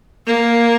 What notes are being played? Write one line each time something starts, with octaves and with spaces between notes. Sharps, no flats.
A#3